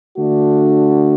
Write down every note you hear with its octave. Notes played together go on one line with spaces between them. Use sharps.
D3 A3 D4 F#4